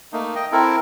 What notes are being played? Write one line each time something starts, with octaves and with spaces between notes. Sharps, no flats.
A3 A#3 D#4
D#5 G5
C4 E4 A4 A#4